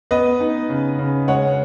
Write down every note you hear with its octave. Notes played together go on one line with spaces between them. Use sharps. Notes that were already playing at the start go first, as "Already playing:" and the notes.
B3 B4 D#5
D#4
C#3
C#3
G#3 C#5 F#5